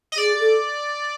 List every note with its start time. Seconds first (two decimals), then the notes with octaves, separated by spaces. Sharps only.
0.12 D#5
0.17 G#4 D5
0.40 A4